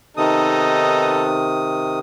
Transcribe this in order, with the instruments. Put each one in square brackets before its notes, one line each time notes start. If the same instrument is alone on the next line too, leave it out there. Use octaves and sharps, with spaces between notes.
[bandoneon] C3 D#3 D#6 [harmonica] B3 D#4 A4